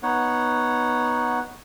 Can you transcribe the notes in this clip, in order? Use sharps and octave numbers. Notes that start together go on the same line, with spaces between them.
B3 D#4 C#5 F#5